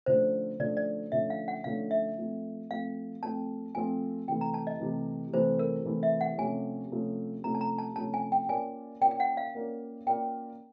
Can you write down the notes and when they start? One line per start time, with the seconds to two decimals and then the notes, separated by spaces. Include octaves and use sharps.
0.06 D3 F3 A3 C#4 C5
0.60 D3 F3 A3 C#4 D5
0.77 D5
1.12 D3 F3 A3 C#4 E5
1.30 F5
1.48 F#5
1.64 D3 F3 A3 C#4 F5
1.91 E5
2.18 F3 A3 C4
2.70 F3 A3 C4 F5
3.23 F3 A3 C4 A5
3.75 F3 A3 C4 G#5
4.28 C3 E3 A3 G5
4.41 A#5
4.54 A5
4.67 D#5
4.80 C3 E3 A3
5.33 C3 E3 A3 C5
5.59 A#4
5.85 C3 E3 A3
6.03 E5
6.21 F#5
6.38 C3 F3 A3 C#4 G#5
6.91 C3 F3 A3 C#4
7.43 C3 F3 A3 C#4 A#5
7.55 A5
7.61 A#5
7.78 A5
7.96 C3 F3 A3 C#4 A5
8.14 G#5
8.32 G5
8.49 A#3 C#4 F4 A#4 D5 G#5
9.01 A#3 C#4 F4 A#4 D5 G5
9.11 G5
9.20 F#5
9.37 F5
9.55 A#3 C#4 F4 A#4 D5
10.06 A#3 C#4 F4 A#4 D5 G5